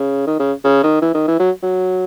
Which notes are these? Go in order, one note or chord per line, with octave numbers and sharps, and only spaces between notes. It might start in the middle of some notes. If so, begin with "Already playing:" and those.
Already playing: C#3
D#3
C#3
C#3
D#3
E3
D#3
E3
F#3
F#3